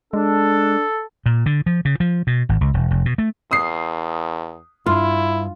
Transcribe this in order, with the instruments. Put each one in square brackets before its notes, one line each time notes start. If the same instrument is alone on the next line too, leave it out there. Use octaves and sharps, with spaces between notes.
[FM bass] G#3 [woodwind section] D4 [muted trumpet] A4
[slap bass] A#2
D3
F3
C#3
F3
B2
G#1
C#2
E1
F1
B2
A3
[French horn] E2 [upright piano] D#6 C7
[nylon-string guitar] G2 [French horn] E4 [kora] F4